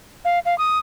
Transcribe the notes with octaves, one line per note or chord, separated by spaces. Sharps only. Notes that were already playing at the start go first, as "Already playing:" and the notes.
F5
F5
D#6